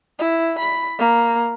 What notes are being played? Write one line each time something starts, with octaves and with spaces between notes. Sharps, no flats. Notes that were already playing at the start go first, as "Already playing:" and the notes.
E4
B5
A#3